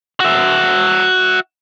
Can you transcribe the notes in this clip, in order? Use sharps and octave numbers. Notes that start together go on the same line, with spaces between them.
F#4 E5